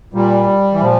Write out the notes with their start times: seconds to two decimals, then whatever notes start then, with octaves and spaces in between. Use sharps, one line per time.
0.13 A#2 G3
0.73 E3
0.81 A#2 F3